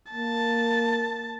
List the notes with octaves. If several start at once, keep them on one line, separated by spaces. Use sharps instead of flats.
A#3 A5